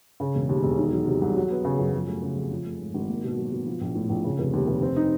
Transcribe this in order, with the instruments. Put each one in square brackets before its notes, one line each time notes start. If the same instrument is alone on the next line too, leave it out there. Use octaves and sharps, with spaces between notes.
[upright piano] C#3
E1
D#2
E1
D#3
F#3
C3
C2
F#3
B3
C#3
F#2
F3
A3
C#3
F2
F3
A3
G#2
G#1
A#3
B2
F#3
B2
F3
A#1
A2
A#1
C#3
F1
D#2
F1
C4
D#4